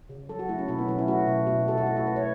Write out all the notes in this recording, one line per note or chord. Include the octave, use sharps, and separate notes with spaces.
C#3
F#3 A4
F#4
A3 E4
C#4
B2 E4
B3
F#3 C#4
E4
A3 F#4
B2
B2
B2 A4
F#4
A3 E4
F#4
A3 B4
C#5